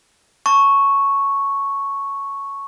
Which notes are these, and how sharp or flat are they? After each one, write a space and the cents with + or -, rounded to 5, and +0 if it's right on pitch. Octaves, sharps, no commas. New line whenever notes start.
A5 +0 C#6 +0